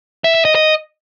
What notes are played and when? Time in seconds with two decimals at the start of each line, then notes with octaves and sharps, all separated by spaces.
0.24 E5
0.35 E5
0.45 D#5
0.55 D#5